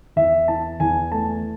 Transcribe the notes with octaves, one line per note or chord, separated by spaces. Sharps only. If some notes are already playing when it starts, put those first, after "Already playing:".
E2 E5
E3 A5
E2 G#5
A3 A5